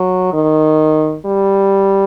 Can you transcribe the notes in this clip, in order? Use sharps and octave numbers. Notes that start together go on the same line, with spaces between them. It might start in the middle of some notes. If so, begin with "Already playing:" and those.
Already playing: F#3
D#3
G3